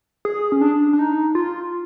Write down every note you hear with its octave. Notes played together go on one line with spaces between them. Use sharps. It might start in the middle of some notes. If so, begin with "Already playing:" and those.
G#4
C#4
D4
D4
D#4
F4